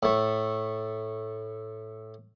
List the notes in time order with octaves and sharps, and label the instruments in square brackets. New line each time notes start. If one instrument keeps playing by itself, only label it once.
[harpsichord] A2 A3